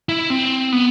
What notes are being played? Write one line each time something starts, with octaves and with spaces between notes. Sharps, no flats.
E4
C4
B3